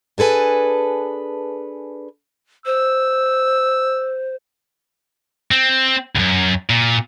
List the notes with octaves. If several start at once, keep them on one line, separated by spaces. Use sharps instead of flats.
D4 G#4 A4 B4 G#5
C5 E6
C4
C#2 F#2
A#2